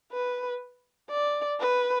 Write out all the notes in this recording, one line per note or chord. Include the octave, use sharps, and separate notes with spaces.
B4
D5
B4